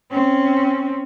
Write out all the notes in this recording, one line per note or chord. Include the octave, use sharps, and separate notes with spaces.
C4 C#4